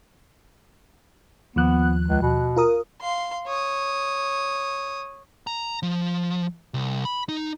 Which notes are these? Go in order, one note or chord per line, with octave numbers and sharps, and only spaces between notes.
D#2 F3 B3 F#6
C#2
B2
F4 A#4 D#6
F5 C6
C#5 D#6
A#5
F3
C2
B5
D#4